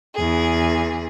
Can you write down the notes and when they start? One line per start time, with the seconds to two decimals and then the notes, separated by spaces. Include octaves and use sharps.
0.15 E2 G#4